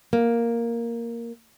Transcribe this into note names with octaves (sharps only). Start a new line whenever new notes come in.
A#3